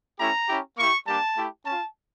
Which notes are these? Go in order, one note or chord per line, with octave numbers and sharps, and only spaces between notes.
A3 C#4 E4 G4 A#5
C#4 E4 G4
A#3 E4 G4 C#6
G3 A#3 D4 G4 A5
A3 E4 G4
C#4 F4 A5